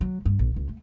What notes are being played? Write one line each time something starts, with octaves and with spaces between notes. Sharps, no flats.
F#3
G2
A#1
C#2
A3